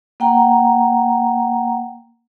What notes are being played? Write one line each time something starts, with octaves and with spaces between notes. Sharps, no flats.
A#3 F#5 G5 A#5